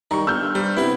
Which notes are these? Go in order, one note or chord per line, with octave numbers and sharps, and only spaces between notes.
D#3 G3 A#5 C#6
G1 E6 F6 G6
G2
G3 C5
C3 B3 E4 B4